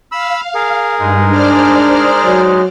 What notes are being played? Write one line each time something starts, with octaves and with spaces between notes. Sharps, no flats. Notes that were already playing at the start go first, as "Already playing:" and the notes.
F5 B5 E6
G#4 A#4
G2 G#3 D#4
D4 C5 D5 F6
F#3